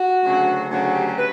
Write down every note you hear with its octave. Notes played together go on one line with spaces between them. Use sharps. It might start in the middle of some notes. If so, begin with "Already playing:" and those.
Already playing: F#4
D2 C#3 F#3
D2 C#3 F#3
F#4
G4
B4